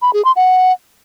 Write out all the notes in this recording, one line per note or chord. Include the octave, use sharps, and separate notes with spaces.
B5
G#4
C6
F#5